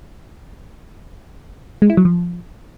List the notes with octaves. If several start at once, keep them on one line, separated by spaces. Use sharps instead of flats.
G#3
E4
F#3
F3